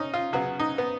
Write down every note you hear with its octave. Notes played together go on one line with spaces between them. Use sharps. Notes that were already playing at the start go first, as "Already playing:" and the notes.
Already playing: C#4 D#4
F4
C#3 F#3 B3 F#4
D#4
B3